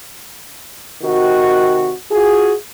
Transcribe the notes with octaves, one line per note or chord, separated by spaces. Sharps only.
C3 D#3 F#4
F4 F#4 G#4